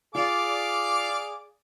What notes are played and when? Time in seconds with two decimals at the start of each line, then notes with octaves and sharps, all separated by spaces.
0.15 F4 G#4 D5 F5 D6